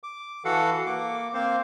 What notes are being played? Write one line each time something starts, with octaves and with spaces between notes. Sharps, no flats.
D6
E3 F#4 A4 F5 F#5
A#3 D6
A#3 C4 C5 F5